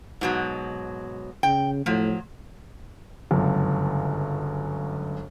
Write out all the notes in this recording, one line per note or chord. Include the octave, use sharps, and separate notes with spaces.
G#2 B2 F#3
C#3 G5
A2 F3 F#3
G1 C#2 F#2